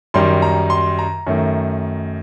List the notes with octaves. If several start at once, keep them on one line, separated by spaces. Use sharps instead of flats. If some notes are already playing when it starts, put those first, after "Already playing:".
F#2 D#3 G3 C6
A#5
C6
A#5
F#2 D#3 A3